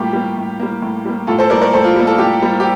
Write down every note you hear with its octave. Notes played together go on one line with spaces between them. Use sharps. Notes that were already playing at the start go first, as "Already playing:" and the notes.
Already playing: A2 G3 A#3 F4 G4
G3 A#3
A2
G3 A#3
A2
G3 A#3
A2 F4 A4
A4 C5
G3 A#3 A#4 D5
A#4 D5
A2 A4 C5
F4
G3 A#3
F4 A4
A2 G4
G3 A#3
G4